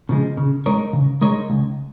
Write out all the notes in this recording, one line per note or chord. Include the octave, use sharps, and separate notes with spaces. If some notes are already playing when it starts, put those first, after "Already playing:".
C#3 F3 G#3
C#3
G#3 D#4 A#4 C#5
C#3
G#3 D#4 A#4 C#5
C#2